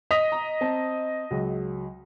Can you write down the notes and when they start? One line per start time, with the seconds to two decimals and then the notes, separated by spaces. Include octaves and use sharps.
0.11 D#5 D#6 B6 F7
0.32 A#5
0.61 C4 A5
1.31 C#2 F#3